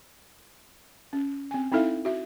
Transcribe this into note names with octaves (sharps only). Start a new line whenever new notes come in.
C#4
C4 G#5
C4 D#4 E4 A4 E5 F5
F#4 E5